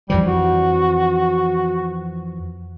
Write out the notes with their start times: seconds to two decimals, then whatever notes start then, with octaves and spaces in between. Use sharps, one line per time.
0.10 F2 E3 F3 G3
0.27 F#4